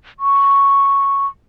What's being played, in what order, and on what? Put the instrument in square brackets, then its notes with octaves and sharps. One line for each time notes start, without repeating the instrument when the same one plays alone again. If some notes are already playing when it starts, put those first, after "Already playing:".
[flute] C#6